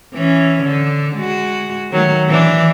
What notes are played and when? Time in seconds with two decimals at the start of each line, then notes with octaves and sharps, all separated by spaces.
0.14 E3 C#4
0.63 D3
1.16 G#3 F#4
1.91 D#3 F#3 A3
2.28 E3 D4